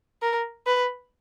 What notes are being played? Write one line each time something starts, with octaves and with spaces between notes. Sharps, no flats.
A#4
B4